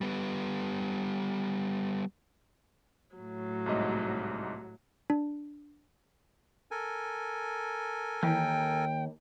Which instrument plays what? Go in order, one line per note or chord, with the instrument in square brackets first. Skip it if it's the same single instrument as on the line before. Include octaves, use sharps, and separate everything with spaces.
[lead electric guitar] G3 B3
[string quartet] A2 F#3
[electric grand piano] C2 G#2 D#5
[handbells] D4
[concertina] A4 A#4 G#5
[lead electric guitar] D#2 [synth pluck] E3 [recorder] G5